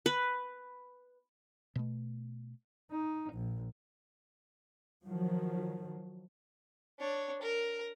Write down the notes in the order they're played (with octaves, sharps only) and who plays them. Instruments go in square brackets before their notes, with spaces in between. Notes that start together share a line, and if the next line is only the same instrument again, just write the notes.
[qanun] B4
[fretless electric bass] B2 A3
[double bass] D#4
A#1
[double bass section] D#3 F3 F#3
[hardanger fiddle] D4 C#5
A#4